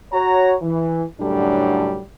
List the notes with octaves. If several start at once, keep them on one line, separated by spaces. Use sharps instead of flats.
F#4 C#5 A#5
E3
F#2 A2 D3 G3 D4